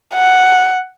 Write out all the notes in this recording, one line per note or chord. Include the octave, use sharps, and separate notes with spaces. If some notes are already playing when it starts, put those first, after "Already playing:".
F#5